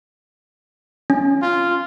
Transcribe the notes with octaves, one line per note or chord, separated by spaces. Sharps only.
C#4
F4